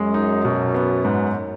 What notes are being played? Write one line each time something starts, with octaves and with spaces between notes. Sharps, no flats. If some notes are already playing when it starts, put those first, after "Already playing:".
Already playing: F#2 G#3
D#4
B2
B3
G#2